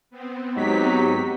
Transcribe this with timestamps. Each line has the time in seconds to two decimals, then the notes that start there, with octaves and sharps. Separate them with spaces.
0.10 B3 C4
0.57 G#2 F#3 D#4 G4 B6